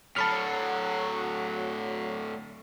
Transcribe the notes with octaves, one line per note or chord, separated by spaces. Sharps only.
A2 D3 F#3 A5 B5 F6